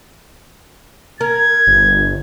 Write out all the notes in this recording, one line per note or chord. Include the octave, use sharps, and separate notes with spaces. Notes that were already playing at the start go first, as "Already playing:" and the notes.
A#4 G#6
G1